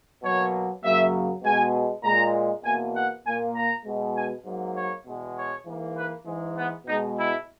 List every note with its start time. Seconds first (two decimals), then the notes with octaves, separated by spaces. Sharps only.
0.23 B2 F#3 A#3 C#5
0.83 F#2 C#3 F#3 A#3 E5
1.43 B2 G#3 G#5
2.03 A#2 G#3 A#5
2.64 E2 B2 A#3 G#5
2.94 F#5
3.25 A#2 A#3 G#5
3.55 A#5
3.85 B2 G#3
4.15 G#5
4.45 G#2 F#3 A#3
4.75 C#5
5.06 E2 B2 G#3
5.35 C#5
5.66 G#2 E3 A#3
5.96 B4
6.26 G#2 E3 G#3
6.56 B3
6.86 B2 G#3 D#4
7.16 E4